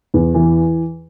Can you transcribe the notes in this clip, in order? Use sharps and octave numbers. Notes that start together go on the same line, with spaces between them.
E2
E3